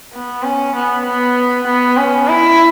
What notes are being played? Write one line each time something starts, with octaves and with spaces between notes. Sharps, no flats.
B3
C#4
B3
B3
B3
C#4
E4